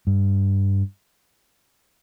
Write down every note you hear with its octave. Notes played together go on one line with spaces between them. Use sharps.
G2